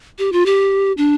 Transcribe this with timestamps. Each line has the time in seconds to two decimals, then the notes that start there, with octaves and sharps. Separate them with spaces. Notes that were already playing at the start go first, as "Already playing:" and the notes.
0.19 G4
0.32 F4
0.46 G4
0.97 D4